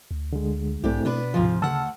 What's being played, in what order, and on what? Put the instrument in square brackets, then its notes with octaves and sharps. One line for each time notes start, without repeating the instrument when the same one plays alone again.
[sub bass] D2
[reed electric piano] D3 G#3
[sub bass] B1 [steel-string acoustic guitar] G#2 D4 G4 [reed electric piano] A3 C4 E4
[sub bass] B2 [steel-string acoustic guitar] B3 D4 B4
[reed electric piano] D2 F4 [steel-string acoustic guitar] G#2 C3 F3
[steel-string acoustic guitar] D2 F#5 [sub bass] C#3 [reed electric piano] A5 E6 F6